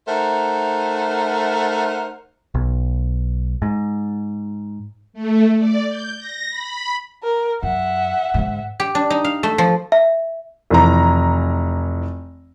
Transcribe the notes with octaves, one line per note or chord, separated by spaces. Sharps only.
A3 D#4 A#4 C5 E5 F#5
B1
G#2
A3
D5
G6
A#6
B5
A#4
F#2 E5 F#5
G#2 D3
G4
D4
D#4
F5
A3
F3
E5
F1 E3 A#5